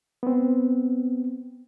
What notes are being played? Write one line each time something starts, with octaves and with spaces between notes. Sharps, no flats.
B3 C4